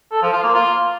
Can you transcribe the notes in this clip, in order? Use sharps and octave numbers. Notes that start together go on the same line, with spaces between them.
A4
F3
F4
A#3
F4